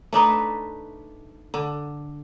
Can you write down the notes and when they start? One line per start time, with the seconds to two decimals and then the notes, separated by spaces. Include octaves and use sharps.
0.13 A3 D4 D#4 B4
1.54 D3